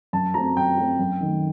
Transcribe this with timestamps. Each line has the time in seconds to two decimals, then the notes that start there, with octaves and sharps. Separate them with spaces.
0.13 F#2 A5
0.34 F#3 A3 C4 A#5
0.56 F#2 G5
0.77 F#3 A3 C4
0.99 F#2
1.21 D#3 A3